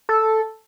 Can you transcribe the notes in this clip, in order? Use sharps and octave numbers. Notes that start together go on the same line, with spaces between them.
A4